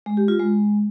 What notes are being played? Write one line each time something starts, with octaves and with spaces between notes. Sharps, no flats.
G#3
G4
F4
G#3